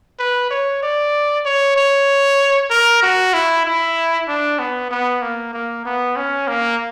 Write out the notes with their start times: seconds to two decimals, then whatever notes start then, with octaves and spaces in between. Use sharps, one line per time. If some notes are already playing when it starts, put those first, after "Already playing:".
0.19 B4
0.51 C#5
0.83 D5
1.45 C#5
1.76 C#5
2.70 A#4
3.02 F#4
3.34 E4
3.65 E4
4.28 D4
4.59 B3
4.91 B3
5.22 A#3
5.53 A#3
5.85 B3
6.16 C#4
6.48 A#3